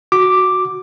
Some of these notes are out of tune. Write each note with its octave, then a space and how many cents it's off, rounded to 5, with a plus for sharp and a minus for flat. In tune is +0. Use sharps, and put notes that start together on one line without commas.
F#4 +0 D6 +0